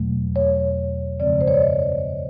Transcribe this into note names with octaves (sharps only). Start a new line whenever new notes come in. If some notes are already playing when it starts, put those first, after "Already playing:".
Already playing: E2 B2 F#3 A3
C#5
F#2 C#3 F3 G#3 C4 D5
C5
C#5
D5
D#5